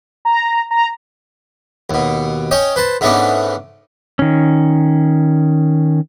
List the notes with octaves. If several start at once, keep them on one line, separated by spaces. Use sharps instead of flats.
A#5
A#5
D#2 B2
C#4 C#5 D#5 G5
B4 C5 A5
G#2 A3 B3 C#4 D4
D#3 C#4